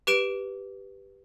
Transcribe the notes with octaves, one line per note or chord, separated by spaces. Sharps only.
G4 B4 D7 E7